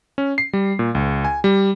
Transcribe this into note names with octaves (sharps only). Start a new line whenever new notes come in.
C#4
C7
G3
A#2
C#2
G#5
G3